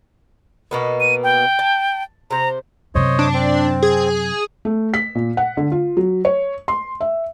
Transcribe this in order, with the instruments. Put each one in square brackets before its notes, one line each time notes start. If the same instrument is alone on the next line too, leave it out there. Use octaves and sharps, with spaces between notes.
[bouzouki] B2 A#3 B3
[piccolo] D#7
G5
[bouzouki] A5
[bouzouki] C3 C5 [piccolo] A#5
[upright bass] F#2 C3 [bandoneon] C5 C#5 D#5
[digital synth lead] D4
[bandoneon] C4
[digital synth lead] G#4
[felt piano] A3
B6
A#2
F#5
D3
F4
F#3
C#5
C6
E5